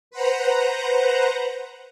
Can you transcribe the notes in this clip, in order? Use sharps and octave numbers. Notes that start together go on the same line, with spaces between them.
B4 C5 F#5 A#5